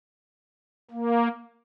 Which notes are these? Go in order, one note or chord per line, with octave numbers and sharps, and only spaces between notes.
A#3